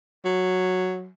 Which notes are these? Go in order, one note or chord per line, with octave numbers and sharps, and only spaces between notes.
F#3